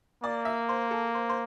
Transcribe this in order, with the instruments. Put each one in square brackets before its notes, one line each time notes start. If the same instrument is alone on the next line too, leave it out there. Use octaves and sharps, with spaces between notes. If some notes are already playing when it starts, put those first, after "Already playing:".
[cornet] A#3 [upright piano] D5
[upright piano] E5
C5
A4
C5
C5